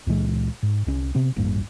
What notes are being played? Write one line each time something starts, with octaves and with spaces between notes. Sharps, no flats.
C#2 A#2 E3 G#3
G#2
C2 C#4
C3 B3 C4
D#1 A1 G2 A#3